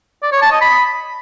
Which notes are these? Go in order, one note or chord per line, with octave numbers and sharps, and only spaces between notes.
D5
C#5
A5
D#5
B5